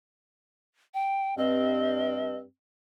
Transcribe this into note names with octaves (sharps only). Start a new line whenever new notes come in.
G5
G2 C4 D#5